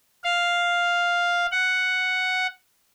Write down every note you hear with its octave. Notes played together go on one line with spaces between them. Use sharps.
F5
F#5